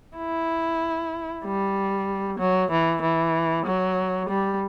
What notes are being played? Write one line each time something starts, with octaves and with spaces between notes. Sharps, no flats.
E4
G3
F#3
E3
E3
F#3
G3